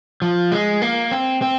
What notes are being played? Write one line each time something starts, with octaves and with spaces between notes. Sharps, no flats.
F3
G#3
A#3
C4
C4